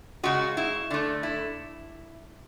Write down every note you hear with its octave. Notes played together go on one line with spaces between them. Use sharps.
C#3 G#3 F#4
E4
D3 A3
E4